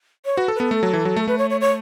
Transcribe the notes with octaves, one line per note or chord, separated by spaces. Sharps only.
C#5
F#4 B4
A4
B4
B3 A4
A3
F#3
E3
F#3
A3
A3 B4
C#5
C#5
C#5